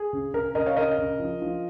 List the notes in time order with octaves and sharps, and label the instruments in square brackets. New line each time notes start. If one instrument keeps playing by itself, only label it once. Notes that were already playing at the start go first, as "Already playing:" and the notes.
Already playing: [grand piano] G#4
C#3
C#3 A#4
C#3 A#4 D#5
C#5 F5
C#3 A#4 D#5
C#3
F3
F3